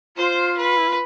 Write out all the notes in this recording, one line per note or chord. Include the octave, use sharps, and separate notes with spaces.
F4 C5
B4
E4
F4